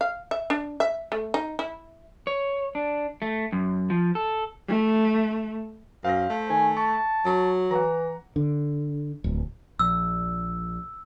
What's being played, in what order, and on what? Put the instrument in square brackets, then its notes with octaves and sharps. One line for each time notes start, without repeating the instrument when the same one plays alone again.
[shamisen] F5
E5
D4
E5
A3
D#4
E4
[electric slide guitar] C#5
D4
A3
F#2
F3
A4
[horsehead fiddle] A3
[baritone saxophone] F#2 [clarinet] C5 [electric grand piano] F5 A#6
[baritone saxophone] A3
[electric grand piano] D#3 [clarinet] G#5
[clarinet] A5 [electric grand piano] C#6
[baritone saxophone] F#3
[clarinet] E3 [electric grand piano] F#5 A#5
[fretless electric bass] D3
D1
[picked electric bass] A#1 [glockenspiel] E6